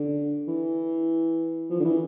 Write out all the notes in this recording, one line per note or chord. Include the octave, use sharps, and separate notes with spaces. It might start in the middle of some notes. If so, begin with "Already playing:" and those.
Already playing: D3
E3
F3
D3
E3